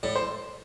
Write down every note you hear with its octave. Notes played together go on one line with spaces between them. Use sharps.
A2 D5
C5